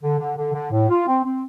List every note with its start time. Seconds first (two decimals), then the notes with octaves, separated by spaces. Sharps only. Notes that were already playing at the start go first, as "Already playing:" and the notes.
0.02 D3
0.19 D3
0.37 D3
0.53 D3
0.71 A2
0.89 F4
1.07 C4
1.24 C4